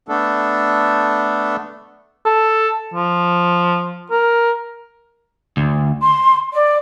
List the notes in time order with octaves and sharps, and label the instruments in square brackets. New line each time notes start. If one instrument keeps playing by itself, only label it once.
[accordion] A3 B3 D4 A4
[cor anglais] A4
F3
A#4
[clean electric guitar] D2
[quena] C6
D5